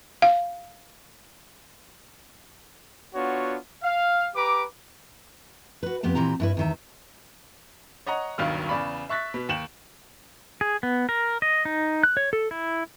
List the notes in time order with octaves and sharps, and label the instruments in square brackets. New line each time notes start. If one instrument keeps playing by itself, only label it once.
[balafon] F5
[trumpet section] B3 D4 F4 F#4 C#5
F5
G4 B4 A#5 D6
[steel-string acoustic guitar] F#4 B4
F2 B3 G4 B4
A#2 E3 C4 G4 A#5
G2 E4 B4
E2 D#3 E5
[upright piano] C#5 D#5 F#5 A#5
D#1 B1 G2 D#3 F#3 F6
E2 C#3 D5 B5 C#6
E5 C#6 F#6 A6 B6
B2
D#2 G5 E7 F#7
[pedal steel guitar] G#4
B3
A#4
D#5
D#4
F#6
C#5
A4
E4